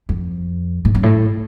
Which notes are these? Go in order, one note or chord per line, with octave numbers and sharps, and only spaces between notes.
F2
A2
F#2
A2